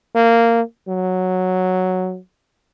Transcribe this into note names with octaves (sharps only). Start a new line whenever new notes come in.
A#3
F#3